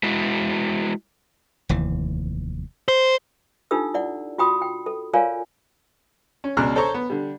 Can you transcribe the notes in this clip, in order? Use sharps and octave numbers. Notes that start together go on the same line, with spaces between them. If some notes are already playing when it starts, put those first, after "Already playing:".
G#3 E4 F#4
F1 D#2 E3
C5
D4 D#4 F4 G4 A4 E6
E4 D5 F#5
F4 F#4 G5 B5 D#6
G5
A4
F4 A#4 C#5 D5 F5 G#5
C#4
C#2 B2 D4 A#5 F6 F#6
A4 C5 C#5 A#5 C#6
B3
D3 G3